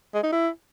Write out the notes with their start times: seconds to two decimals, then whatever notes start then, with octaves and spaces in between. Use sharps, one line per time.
0.14 G#3
0.23 D#4
0.32 E4